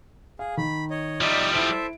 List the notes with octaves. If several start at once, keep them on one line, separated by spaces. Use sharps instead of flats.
G#4 F5
D#3 B5
C#5 D#5
F3 G3 D#4 D5 E5
E4 A4 C5 E5 D7